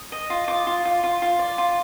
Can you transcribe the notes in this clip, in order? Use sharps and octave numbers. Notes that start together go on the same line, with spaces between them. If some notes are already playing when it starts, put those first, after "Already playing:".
Already playing: D#6
D#5
F4
F4 D6
F4
F4
F4
F4
D5
F4